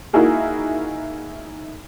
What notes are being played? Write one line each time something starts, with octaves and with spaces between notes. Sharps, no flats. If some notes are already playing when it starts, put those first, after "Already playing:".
A#3 D#4 E4 F#4 G#4 A#4